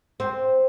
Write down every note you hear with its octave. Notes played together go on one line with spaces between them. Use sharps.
C4